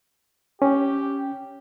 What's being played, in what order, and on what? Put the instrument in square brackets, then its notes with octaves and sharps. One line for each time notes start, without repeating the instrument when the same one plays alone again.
[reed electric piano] C#4 [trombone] G4